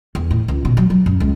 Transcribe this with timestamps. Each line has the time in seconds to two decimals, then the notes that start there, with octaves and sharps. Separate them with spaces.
0.15 E2
0.31 A2
0.48 C#2
0.65 B2
0.77 F#3
0.90 F#3
1.06 F#2
1.20 C#2